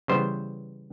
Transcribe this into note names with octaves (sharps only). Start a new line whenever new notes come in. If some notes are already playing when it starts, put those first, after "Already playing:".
C#3 E3 G3 B3 C5